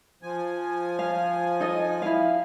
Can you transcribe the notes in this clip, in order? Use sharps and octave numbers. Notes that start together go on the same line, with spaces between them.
F3 G#5
F5
D#4 A4 D#5
E4 F5